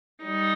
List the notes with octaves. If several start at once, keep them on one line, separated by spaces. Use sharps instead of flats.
G3 D#4